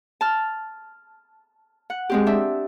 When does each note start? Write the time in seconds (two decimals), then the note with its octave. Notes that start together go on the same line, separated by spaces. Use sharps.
0.21 A5 F6
1.90 F#5
2.10 G#3 C4 G4
2.27 D4 E5